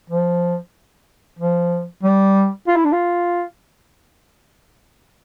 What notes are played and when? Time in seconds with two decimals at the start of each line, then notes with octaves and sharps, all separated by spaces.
0.10 F3
1.39 F3
2.03 G3
2.68 F4
2.76 E4
2.85 D4
2.92 F4